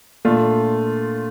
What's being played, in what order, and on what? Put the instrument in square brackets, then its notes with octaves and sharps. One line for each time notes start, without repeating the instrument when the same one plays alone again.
[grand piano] A#2 A3 D4 F4